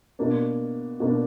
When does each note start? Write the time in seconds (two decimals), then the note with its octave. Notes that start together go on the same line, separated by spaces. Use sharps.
0.19 B2 A#3 D4
1.00 B2 A#3 D4